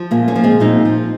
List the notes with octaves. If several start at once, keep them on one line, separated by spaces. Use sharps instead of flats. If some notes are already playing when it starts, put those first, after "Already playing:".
Already playing: F3
A#2 A#3 C#4
A#3 C#4
F3
G#3 C4
A#2 C4 D#4
F3